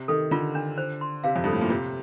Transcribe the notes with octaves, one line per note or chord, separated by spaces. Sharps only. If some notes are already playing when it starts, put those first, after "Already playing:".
Already playing: C3
D#3 A4
D3 F4
D4
C5
C6
C3 F5
F2
G2 A4
A2
A#2
C3 F4